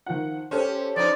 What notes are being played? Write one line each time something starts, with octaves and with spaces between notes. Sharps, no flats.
D#3 F3 F#5
C#4 G4 A4 C5
F3 D#4 D5